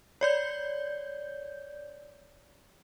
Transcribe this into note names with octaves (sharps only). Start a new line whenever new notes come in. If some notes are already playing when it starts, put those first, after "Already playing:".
C#5 D5 G6